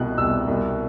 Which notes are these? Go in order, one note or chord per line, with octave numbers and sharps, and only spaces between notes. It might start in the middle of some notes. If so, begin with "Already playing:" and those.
Already playing: C2 B2 F#6
C2 E6
C2